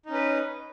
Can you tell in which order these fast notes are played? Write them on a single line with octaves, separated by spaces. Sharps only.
D#4 C#4 B4